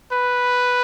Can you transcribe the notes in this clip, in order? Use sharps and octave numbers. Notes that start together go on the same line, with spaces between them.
B4